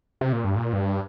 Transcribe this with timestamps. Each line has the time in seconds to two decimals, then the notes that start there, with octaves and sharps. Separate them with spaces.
0.21 C3
0.33 A#2
0.44 G2
0.56 A#2
0.73 G2